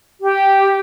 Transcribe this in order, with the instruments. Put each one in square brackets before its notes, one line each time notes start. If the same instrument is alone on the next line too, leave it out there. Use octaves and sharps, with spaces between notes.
[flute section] G4